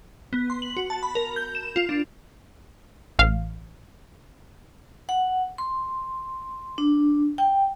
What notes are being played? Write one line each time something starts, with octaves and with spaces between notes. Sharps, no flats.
B3
C6
F#7
F#4
A5
B5
A#4
G6
E7
F4
D4
A1 F5
F#5
C6
D4
G5